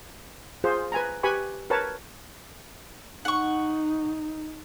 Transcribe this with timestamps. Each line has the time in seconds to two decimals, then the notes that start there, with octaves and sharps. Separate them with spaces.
0.64 F4 G#4 C5
0.92 B4 G#5 A#5
1.23 G4 B4 G#5 B5 C#6
1.70 A#4 B4 C#5 A5
3.25 D#4 F#5 C#6